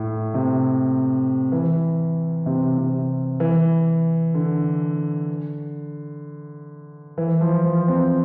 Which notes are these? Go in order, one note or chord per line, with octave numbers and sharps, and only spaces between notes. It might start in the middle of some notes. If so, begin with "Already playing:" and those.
Already playing: A2
C3
E3
C3
C3
E3
D3
E3
F3
F3
C4